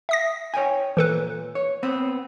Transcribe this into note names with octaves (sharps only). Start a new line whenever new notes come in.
E5 D#6 A#6
C#5 G5 G#5
A#2 E3 A4 B4
C#5
B3 C4 B4